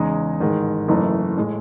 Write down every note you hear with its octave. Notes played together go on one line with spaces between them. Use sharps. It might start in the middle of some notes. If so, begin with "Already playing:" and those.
Already playing: E2 C#3 G#3 D#4
A1 G#2 D#3 G#3
F#1 F#2 E3 A3 D#4
A2 G#3